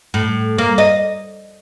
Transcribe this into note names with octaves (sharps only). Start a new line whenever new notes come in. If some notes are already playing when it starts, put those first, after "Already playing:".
A2
A#3
D#5